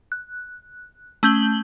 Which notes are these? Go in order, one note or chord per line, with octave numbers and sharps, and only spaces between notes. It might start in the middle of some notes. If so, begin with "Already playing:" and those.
F#6
A3 C#4 G6 F#7 G7